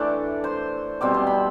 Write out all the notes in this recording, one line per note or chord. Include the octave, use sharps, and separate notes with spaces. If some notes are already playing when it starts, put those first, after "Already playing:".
Already playing: E3 A3 D4 D5 C6 D6
C5 C6
B2 G3 C4 D6
C6
B5